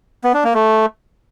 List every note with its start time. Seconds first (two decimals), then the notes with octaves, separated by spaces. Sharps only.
0.24 B3
0.34 D4
0.44 A#3
0.54 A3